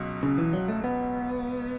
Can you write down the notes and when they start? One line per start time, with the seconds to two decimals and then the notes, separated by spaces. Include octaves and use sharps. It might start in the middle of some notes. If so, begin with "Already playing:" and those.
Already playing: C#2 B2 F#3
0.23 C#3
0.38 E3
0.53 F#3
0.68 A3
0.84 B3